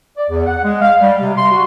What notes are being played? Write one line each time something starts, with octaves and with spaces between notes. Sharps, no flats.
D5
E2
F#5
G#3
F5
G3
C3
C6
F#4